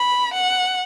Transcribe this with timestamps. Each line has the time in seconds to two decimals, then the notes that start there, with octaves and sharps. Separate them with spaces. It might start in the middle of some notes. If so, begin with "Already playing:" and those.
Already playing: B5
0.34 F#5